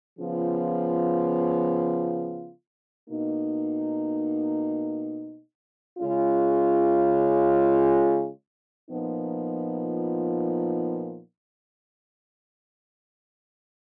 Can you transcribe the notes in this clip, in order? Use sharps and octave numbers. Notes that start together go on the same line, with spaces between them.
C#3 F3 B3 F4
B2 A#3 D#4
C#3 G#3 C#4 F4
A#2 F3 B3 D#4